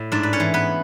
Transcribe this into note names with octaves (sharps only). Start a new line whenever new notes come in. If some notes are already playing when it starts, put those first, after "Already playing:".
Already playing: A2
G#2 D4 D5
B4
C#4 C#5
E3
B3 B4